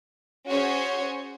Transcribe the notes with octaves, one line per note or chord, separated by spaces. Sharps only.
C#4 F#4 G#4 C5 C#5